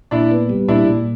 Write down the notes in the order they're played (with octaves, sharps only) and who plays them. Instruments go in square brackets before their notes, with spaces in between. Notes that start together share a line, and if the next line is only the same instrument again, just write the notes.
[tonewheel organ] A#2 [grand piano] D4 E4
[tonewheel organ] B3
G3
[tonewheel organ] A#2 [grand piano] D4 E4
[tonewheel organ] A#2